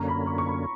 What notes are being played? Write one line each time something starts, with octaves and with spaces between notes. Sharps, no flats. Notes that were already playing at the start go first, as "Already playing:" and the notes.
Already playing: F#2 D3 A#3 C#4 A#5
B5
C#6
C#6
B5